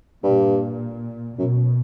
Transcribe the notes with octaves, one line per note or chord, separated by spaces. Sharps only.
G2 A#2
F#2 B2